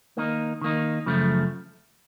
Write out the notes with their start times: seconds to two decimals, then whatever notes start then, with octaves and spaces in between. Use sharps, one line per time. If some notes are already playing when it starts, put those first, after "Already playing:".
0.17 D#3 A#3 D#4
0.62 D#3 A#3 D#4
1.06 F#2 C#3 F3 A3